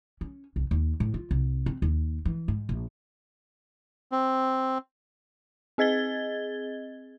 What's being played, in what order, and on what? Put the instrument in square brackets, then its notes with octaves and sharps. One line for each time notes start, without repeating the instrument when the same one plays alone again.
[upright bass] C#4
C2
D#2
A2
F4
C2
C4
D#2
E3
G#2
A#1
[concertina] C4
[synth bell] C4 G#4 D#5 G#6 A6 G7